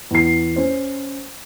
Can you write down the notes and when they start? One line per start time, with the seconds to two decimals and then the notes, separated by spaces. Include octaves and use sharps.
0.11 E2 C7
0.56 C#4 C5